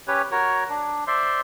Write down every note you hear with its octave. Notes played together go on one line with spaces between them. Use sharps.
C#4 G4 B4 C#5
F#4 A#4 C#5
D4
C5 D5 E5 C6